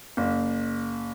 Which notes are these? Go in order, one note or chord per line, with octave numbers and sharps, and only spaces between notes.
F#1